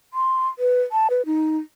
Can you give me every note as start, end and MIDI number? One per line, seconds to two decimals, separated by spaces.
0.14 0.48 84
0.59 0.81 71
0.92 1.08 81
1.10 1.22 71
1.26 1.58 63